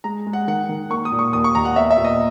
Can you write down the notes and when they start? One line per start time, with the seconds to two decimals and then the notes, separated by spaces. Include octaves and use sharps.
0.04 G#3 A#5
0.27 G#3
0.33 F#5
0.47 D#3 F#5
0.69 D#3
0.90 A#3 C#6
1.05 D#6
1.12 A#2
1.19 C#6
1.33 D#2 D#6
1.44 C#6
1.55 D#2 A#5
1.65 F#5
1.76 B3 E5
1.91 E5
1.97 A#2
2.04 D#5